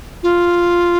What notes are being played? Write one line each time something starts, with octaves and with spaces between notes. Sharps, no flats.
F4